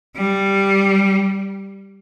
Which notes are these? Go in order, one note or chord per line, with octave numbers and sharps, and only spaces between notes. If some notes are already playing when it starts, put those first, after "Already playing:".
G3